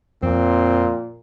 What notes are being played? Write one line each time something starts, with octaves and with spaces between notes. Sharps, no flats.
F2 A#2 C4